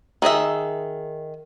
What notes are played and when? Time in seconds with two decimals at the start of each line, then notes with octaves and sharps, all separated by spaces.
0.22 D#3 G#4 D#5 E5